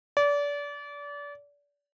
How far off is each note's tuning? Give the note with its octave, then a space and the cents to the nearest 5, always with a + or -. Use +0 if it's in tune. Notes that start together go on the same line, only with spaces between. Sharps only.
D5 -30